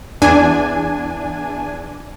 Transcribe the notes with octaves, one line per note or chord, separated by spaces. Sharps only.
E2 D4 G#5